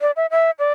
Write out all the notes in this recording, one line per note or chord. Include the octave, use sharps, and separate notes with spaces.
D5
E5
E5
D5